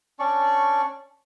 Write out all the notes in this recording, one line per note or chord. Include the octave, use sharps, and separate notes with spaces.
C#4 D4 D5 C#6